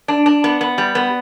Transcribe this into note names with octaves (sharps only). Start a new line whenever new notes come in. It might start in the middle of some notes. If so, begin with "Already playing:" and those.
D4
D4
B3
B3
G3
B3